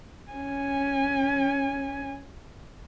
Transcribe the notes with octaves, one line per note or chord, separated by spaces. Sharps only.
C#4 G#5